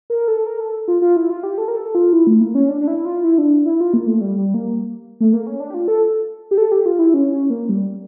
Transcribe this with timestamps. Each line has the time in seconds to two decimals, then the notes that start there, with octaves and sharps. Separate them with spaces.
0.10 A#4
0.28 A4
0.47 A#4
0.60 A4
0.88 F4
1.02 F4
1.17 E4
1.30 F4
1.43 G4
1.58 A4
1.68 A#4
1.76 A4
1.95 F4
2.13 E4
2.27 A3
2.40 A#3
2.55 C#4
2.68 D4
2.81 D4
2.88 E4
3.05 F4
3.24 E4
3.38 D4
3.66 E4
3.80 F4
3.94 A#3
4.07 A3
4.21 G3
4.36 G3
4.54 A#3
5.21 A3
5.33 A#3
5.47 C#4
5.60 D4
5.70 G4
5.74 F4
5.88 A4
6.51 G4
6.58 A4
6.72 G4
6.86 F4
6.99 E4
7.14 C#4
7.32 C#4
7.50 A#3
7.69 G3